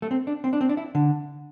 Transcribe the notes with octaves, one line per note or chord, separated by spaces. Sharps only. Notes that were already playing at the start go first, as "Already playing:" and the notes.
A3
C4
D4
C4
D4
C4
D4
E4
D3